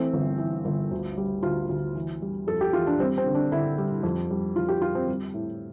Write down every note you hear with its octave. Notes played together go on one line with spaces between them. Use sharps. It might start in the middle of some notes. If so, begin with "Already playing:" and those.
Already playing: E3 A3 C4
G1
E3
G1
D2
G3
D2 F4
D2
E3
G3
F2 A4
G4
E3 F4
D4
G3 C4
C4
D3
D4
D3 E4
G3
F2
G3
F2 F4
G4
G3 F4
C4
G3
A2